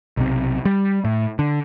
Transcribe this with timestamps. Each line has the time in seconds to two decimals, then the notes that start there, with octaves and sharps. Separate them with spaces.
0.17 B1 C3
0.65 G3
1.04 A2
1.39 D3